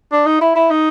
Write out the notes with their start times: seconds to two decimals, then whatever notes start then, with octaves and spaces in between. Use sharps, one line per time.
0.12 D4
0.26 D#4
0.41 E4
0.55 E4
0.71 D#4